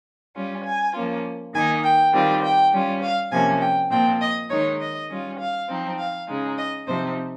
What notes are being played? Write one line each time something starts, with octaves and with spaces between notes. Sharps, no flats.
G3 C#4 F4
G#5
F3 A#3 C#4 F4
D#3 A#3 D#4 G#5
G5
D#3 G3 C4 F4
G5
G3 C#4 F4
F5
C3 F3 A#3 C#4 G#5
G5
A#2 F3 C4 G5
D#5
D#3 G#3 D#4 C#5
D#5
G3 C#4 F4
F5
F3 C4 D#4
F5
C#3 G#3 D#4
D#5
C3 F3 C4 D#4 C5